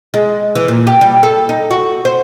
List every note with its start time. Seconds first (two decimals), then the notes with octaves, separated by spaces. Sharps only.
0.14 G#3
0.55 E3
0.68 A#2
0.87 G4
1.01 G3
1.23 A4
1.49 D#4
1.71 F#4
2.05 C5